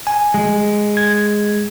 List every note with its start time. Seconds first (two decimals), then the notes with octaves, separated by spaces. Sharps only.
0.07 G#5
0.34 G#3
0.97 G#6